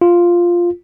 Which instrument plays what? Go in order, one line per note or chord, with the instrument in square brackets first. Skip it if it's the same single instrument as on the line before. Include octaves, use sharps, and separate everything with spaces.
[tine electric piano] F4